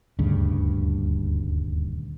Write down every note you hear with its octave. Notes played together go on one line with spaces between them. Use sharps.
D#1 D2 G2 C#3